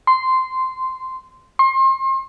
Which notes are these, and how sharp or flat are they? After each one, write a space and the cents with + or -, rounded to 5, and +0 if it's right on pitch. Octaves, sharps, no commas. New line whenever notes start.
C6 -10
C6 +35